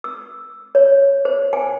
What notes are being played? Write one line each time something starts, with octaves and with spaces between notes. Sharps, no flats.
E6
C#5
C5
G#5